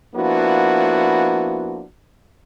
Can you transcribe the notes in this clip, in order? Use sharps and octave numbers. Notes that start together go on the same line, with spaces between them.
F3 A#3 B3 D4 E4 F#4